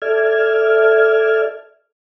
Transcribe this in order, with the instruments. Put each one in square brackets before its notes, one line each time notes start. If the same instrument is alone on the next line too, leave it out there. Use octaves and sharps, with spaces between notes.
[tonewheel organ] A4 D5 E5 F6 G#6